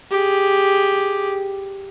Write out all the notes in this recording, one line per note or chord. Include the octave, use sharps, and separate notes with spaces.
G4 G#4